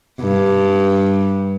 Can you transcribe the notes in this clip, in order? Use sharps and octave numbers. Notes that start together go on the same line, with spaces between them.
G2